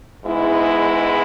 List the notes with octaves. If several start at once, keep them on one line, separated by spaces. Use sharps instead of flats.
G#2 G#3 B3 E4